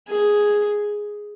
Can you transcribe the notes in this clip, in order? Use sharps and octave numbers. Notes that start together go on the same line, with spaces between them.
G#4